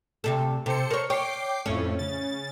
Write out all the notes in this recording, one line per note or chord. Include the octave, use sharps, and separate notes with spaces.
D2 C3 A4
C3 A4 C5 C#7
A#4 C#5
C#5 G5 D6 C7
F2 A2 A3 C#4
C#3 A6